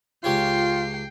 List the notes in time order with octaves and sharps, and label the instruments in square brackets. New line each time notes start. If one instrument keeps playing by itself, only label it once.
[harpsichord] C#2 G4 C#5 [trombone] F4 [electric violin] G5 C7